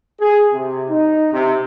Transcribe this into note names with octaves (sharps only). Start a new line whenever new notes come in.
G#4
C3
D#4
C3